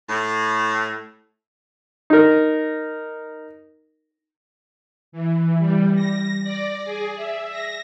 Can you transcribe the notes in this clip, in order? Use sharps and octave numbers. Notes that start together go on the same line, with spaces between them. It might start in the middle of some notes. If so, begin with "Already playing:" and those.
A2
D#4 A#4
E3
G3
A#6
D5
G#4
E5
A#6